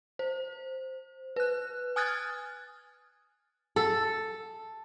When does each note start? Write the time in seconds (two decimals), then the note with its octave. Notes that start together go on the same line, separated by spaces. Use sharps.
0.19 C5
1.36 B4 F#6
1.96 G#5 D#6 F6 F#6 G#6 A6
3.76 A4